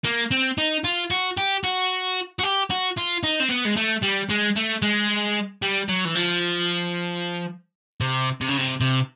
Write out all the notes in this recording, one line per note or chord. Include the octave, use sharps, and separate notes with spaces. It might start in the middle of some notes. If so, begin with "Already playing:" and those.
A#3
C4
D#4
F4
F#4
G4
F#4
F#4
G4
F#4
F4
D#4
C4
B3
G#3
A3
G3
G#3
A3
G#3
G3
F#3
E3
F3
C3
C3
C#3
C3
C3